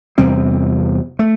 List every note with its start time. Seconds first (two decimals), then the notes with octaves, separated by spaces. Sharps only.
0.18 E2 C3 G3 C4
1.19 A3